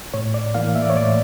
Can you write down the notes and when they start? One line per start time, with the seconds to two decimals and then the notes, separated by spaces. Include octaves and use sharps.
0.14 A2 C#5
0.34 D5
0.55 E3 A#3 F5
0.75 E5
0.82 D5
0.90 C#5
0.95 A2 D5